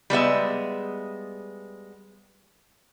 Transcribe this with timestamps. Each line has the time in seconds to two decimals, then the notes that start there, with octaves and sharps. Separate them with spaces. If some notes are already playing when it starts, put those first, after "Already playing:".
0.10 G3 G#3 B3 E5